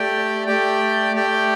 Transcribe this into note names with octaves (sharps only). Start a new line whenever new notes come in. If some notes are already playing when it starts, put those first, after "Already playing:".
Already playing: A3 G4 D5 G5
A3 G4 D5 G5
A3 G4 D5 G5